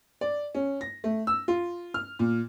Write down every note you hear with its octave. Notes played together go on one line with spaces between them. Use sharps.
D5
C#4
A#6
A3
E6
F4
F6
A#2